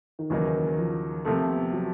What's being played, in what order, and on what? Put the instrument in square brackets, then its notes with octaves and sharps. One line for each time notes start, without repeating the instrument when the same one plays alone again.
[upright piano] D#3
[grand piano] D#2 C#3 F#3 A#3 D#4 [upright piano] E3
[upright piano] F3
[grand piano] C3 F3 A3 [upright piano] A#3
[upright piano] B3
F#3